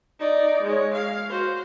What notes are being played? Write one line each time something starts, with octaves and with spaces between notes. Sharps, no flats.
D#4 D5
G#3 C#5
F5
F#4 C5